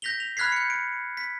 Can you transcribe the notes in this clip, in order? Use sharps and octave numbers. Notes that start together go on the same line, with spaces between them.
G6 A#6 B6 F7 G7
F7
B5 F6 F#6 G#6 B6 C7
G6 C#7
D7
B6